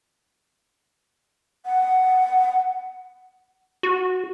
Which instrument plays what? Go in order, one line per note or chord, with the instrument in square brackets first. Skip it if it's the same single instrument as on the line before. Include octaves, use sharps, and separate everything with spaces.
[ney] F#5
[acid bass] F#4